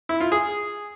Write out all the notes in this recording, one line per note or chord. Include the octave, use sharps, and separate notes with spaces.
E4
F4
G#4